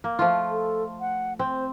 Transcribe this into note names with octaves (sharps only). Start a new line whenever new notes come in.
A#3
F3 A3 F4
A4
F#5
C4 C5